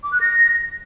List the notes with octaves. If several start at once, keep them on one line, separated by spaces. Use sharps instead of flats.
D6
F#6
A#6